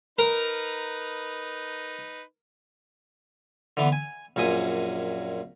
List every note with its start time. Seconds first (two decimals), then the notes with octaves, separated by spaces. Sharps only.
0.19 D#4 A#4 B4
3.77 D3 E3 B3
3.92 G#5
4.36 A#1 F#2 A#2 G#5 D#6